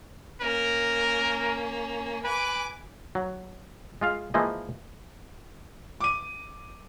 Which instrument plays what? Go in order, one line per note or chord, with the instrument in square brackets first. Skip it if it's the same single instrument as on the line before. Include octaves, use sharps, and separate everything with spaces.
[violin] A#3 C#4 [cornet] A#4
[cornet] B4 [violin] G#5 D6
[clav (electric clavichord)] F#3
G#3 F4 F5
E3 F3 G#3 A#3 D#5
[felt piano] D6 D#7